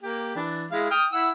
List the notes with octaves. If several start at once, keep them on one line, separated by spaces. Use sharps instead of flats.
A#3 G4
E3 D4
G#3 E4 F5
G5 D#6 F6
E4 F#5 E6